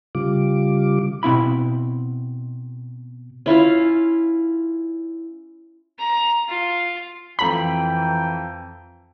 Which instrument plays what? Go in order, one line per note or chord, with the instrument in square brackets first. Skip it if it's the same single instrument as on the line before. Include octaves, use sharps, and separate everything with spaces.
[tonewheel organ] C#3 G3 F4 D6
[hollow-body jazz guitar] B2 C4 E4 B5
[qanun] C#4 E4 F4 F5
[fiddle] A#5
F4
[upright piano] F2 A4 A#5 [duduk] E3 [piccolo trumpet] G5 [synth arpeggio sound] B5